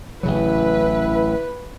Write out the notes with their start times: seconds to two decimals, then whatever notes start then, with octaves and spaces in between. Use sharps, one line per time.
0.23 A1 C#3 F#3 E4 B4